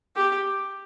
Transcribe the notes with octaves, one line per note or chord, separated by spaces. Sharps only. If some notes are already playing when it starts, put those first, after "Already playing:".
G4